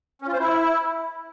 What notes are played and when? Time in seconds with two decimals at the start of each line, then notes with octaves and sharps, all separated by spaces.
0.22 C#4
0.28 F4
0.33 C5
0.39 E4